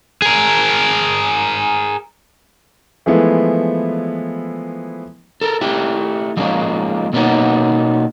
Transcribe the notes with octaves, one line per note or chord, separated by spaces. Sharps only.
G#4 A#4
E3 F3 G#3 A3 B3 E4
A4 A#4
A3 E4 G4
F3 G#3 A#3 C#4
B2 A#3 B3 C#4 D#4